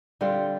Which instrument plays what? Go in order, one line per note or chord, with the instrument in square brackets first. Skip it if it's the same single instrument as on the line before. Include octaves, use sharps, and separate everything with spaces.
[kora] D3 G3 C4 F4